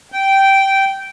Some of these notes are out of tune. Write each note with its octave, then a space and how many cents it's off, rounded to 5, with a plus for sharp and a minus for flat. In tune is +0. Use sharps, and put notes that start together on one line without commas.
G5 -10